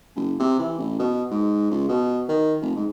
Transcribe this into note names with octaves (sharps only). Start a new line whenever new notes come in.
F#1
C3
E3
A1
B2
G#2
C#2
B2
D#3
F1
G#2